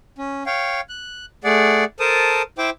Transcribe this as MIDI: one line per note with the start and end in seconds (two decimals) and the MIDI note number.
0.18 0.43 61
0.46 0.81 73
0.46 0.81 77
0.46 0.81 79
0.89 1.26 90
1.44 1.84 57
1.44 1.84 68
1.44 1.84 74
1.44 1.84 78
2.00 2.42 69
2.00 2.42 70
2.00 2.42 72
2.00 2.42 81
2.00 2.42 87
2.58 2.70 64
2.58 2.70 72
2.58 2.70 76
2.58 2.70 79
2.58 2.70 86